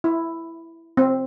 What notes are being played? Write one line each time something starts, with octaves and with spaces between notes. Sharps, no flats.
E4
C4